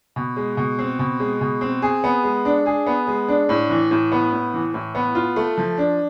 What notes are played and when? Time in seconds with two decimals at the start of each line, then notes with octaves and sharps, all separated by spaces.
0.16 B2
0.37 G#3
0.57 B2
0.79 C4
0.99 B2
1.20 G#3
1.41 B2
1.61 C4
1.82 G#4
2.04 B3
2.24 G#3
2.45 D4
2.66 G#4
2.86 B3
3.07 G#3
3.28 D4
3.49 A2
3.70 E3
3.91 A2
4.12 B3
4.32 A2
4.54 E3
4.74 A2
4.95 B3
5.15 F4
5.36 A3
5.58 F3
5.78 D4